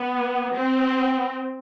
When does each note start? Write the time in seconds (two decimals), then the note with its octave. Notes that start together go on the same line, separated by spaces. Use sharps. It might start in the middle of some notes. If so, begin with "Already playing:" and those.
Already playing: B3
0.54 C4